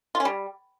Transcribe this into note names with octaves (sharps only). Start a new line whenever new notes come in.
F4
C#4
G3